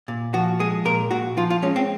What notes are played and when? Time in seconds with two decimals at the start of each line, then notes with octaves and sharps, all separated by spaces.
0.08 A#2
0.34 F3 F#4
0.59 G#3 G#4
0.85 A#2 A#4
1.11 A#2 F#4
1.37 F3 F4
1.50 F4
1.62 G#3 C#4
1.76 C4